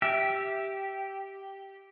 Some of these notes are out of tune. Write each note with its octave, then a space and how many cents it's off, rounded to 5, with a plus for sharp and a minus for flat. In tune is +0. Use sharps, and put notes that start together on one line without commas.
G4 -5 E5 +0